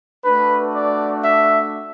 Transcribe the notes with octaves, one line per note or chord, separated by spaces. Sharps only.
A3 D4 F#4 B4
D5
E5